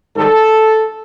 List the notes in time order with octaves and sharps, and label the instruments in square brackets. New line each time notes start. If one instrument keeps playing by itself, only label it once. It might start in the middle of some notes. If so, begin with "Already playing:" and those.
[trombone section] G#2 D#3 G3 A4